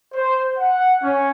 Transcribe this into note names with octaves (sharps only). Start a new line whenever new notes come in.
C5
F#5
C#4